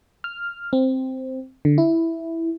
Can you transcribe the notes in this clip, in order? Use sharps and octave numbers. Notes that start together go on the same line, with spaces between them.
F6
C4
D3
E4